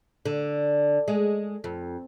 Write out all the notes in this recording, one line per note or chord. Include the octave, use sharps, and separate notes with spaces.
D3
G#3
F2